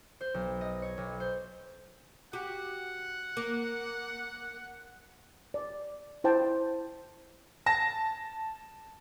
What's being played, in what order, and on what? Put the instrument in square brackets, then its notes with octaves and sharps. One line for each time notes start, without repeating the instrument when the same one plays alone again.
[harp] C5
B1
D#5
C#5
B1
C5
[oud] F#4 G4 [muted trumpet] F#5
[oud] A#3
[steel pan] D5
E4 C5 G5 A5
[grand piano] A5 A#6